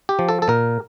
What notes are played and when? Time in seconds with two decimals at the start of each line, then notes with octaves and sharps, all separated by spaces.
0.09 G4
0.19 F3
0.29 A4
0.42 A4
0.48 A#2 A#4